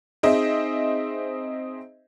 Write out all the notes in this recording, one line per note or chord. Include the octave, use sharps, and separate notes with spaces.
C4 D#4 G#4 C5 D#5 E5